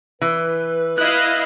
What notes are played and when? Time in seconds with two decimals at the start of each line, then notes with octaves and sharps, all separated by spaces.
0.21 E3 B4
0.98 E4 D#5 F5 F#6